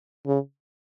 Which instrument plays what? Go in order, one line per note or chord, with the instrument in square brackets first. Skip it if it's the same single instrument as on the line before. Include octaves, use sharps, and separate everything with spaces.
[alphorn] C#3